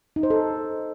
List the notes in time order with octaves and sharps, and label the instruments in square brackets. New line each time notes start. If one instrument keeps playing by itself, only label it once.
[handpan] D#4
C5
A4